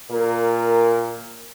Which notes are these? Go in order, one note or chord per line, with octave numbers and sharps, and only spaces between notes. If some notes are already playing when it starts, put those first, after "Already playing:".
A#2 A#4